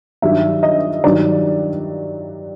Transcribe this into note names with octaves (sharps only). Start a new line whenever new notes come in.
G2 D#3 F#3 E5
D#5
G2 D#3 F#3 D5